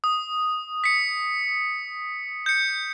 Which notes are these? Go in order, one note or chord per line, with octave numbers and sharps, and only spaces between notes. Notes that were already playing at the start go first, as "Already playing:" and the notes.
D#6
B6 C#7
G6 C#7